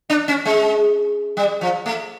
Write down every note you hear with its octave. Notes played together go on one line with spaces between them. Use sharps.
D4
C#4
G#3
G3
F3
A3